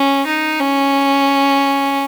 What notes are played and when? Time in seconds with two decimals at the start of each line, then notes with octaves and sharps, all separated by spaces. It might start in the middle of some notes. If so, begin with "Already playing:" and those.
Already playing: C#4
0.26 D#4
0.60 C#4